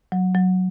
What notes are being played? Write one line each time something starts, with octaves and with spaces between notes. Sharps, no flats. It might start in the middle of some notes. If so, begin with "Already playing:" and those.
F#3
F#3